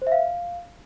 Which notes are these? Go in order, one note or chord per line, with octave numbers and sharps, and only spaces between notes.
C5
E5
F5